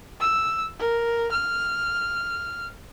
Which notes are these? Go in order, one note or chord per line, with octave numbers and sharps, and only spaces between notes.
E6
A#4
F6